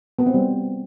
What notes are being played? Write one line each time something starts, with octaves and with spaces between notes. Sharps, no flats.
B3
C4
G3